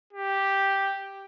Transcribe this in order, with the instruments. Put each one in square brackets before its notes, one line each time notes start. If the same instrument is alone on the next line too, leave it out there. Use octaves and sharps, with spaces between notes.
[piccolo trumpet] G4